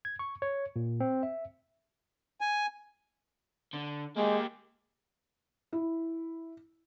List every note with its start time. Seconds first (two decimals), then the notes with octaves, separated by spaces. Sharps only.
0.05 G#6
0.19 C#6
0.42 C#5
0.76 A#2
1.00 C4
1.23 E5
2.41 G#5
3.73 D3
4.17 G#3 A#3 G4
5.73 E4